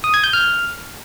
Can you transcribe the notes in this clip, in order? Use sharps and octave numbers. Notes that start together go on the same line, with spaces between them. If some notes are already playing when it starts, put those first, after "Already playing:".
D#6
G#6
G6
F6